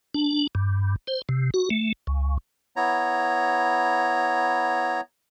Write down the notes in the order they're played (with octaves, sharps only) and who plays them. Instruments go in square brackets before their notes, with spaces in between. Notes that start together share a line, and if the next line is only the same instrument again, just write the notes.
[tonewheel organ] D4
G2
C5
C3
F#4
A3
C#2
[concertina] B3 E4 C#5 A#5